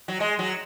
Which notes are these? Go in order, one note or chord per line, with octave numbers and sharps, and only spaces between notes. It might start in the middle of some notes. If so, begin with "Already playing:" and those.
F#3
G#3
F#3